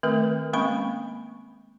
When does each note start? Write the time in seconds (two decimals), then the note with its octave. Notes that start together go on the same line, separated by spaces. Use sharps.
0.03 D#3 A3 C4 A#4 B4
0.53 G#3 A#3 C4 C#4 B5 C#6